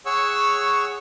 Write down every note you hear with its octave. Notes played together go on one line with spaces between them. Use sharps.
G#4 C#5 F#5 C#6 E6